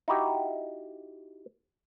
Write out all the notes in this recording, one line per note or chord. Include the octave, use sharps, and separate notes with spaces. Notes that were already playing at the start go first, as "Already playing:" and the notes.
D#4 E4 F#4 G4